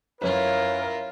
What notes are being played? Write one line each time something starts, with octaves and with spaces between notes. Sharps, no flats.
F#2 E4 F4 A#4 B4 C#5